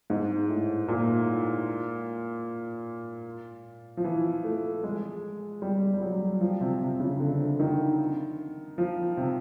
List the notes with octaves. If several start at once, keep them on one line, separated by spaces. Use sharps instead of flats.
G#2
A2
A#2
F3
E3
A3
G#3
G3
G3
F#3
F3
C3
C3
C#3
D3
D#3
F3
C3